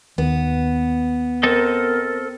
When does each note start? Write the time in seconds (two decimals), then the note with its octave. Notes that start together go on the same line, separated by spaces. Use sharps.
0.18 D#2 D#3 B3
1.43 C4 A4 A#4 D#5